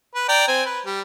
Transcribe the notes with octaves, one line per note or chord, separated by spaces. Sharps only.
B4
D5 G5 A#5
C4 G#5
B4
G3